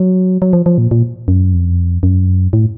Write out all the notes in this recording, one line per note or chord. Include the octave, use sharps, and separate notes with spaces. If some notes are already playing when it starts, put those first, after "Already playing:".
Already playing: F#3
F#3
F3
F3
A#2
A#2
F#2
F2
F#2
A2